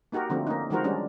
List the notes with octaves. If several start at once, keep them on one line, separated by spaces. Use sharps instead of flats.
A#3 D#4 F#4 G4 A#4
D3 F3 A3 A#3 C4
A#3 C#4 D#4
D#3 F3 G#3 F#4 A#4 C5
G3 G#3 C#4 D4